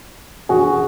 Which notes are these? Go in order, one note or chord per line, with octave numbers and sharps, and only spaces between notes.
F#4 G#4